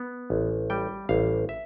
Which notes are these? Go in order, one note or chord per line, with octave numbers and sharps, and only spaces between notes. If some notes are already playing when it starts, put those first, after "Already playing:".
Already playing: B3
A1
G3 G5
A1 F5
E5